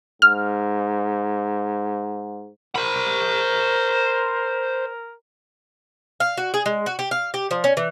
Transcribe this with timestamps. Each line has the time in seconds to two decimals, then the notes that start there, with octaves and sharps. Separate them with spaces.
0.22 G#2 F6
2.76 A#4 C5 B5
6.20 F5
6.37 F#4
6.54 G#4
6.66 G#3
6.86 F#4
6.99 G4
7.11 F5
7.34 G4
7.51 F3
7.64 C#4
7.77 E3